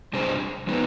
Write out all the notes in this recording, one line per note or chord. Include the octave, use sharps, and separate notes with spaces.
C3 G3 D4 G#4 C5
F3 G#3 B3 D#4